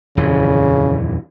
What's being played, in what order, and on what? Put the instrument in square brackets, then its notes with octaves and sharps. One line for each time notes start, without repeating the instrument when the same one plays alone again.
[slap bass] D#1 F2 E3 [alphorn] C#3